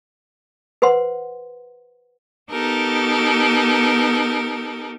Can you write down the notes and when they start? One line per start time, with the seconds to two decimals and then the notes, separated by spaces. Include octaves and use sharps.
0.82 B4 C5 F#5 C6
2.50 B3 D#4 G4 A4 A#4